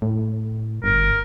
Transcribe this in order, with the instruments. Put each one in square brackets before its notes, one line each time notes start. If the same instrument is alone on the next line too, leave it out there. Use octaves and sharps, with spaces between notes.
[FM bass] A2
[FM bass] G1 [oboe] A#4